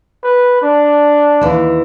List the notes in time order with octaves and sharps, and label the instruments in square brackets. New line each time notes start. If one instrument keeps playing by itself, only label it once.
[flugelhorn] B4
D4
[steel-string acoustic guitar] D#2 E3